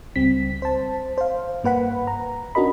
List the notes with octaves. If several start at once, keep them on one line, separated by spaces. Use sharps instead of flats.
C#2 G3 C4 B6
C5 A5
C5 F5
G2 A#3 B4 F#5 B5
A#5
C#4 D4 F#4 A#4 D#5 B5